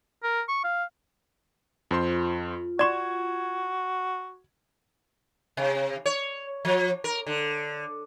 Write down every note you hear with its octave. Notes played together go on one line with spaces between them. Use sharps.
A#4
C#6
F5
F2 F4 C5 C6
F#4 D5 C6 C#6 G#6 E7
C3
C#5
F3
A#4
D3